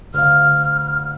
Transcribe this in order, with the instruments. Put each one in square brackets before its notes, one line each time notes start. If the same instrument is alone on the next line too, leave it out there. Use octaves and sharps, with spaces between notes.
[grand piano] D2 F5 [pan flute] F6